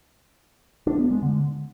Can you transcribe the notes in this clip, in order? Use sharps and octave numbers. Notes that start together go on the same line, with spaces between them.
D4
B3
G#3
D3